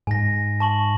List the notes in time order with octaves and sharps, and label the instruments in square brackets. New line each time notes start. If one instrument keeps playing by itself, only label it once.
[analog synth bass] G#2 [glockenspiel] G#5 A#6
[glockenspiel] A5 C#6 F#7